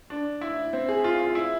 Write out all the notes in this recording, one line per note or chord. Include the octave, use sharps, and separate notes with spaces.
D4
E4
C4
G#4
F4
F4
E4